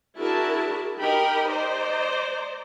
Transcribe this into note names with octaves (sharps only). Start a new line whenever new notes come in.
D4 E4 F#4 G#4 A#4 A5
D#4 G4 A#4 D#5 G5 B5
C5 D5 D#5 A#5